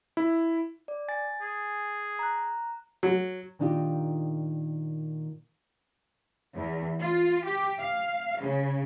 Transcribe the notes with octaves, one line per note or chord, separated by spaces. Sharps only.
E4
D5
G#5 A6
G#4
A#5 F#6
F#3
A#2 D#3 D4 D#4 F4 G4
E2
F4
G4
F5
C#3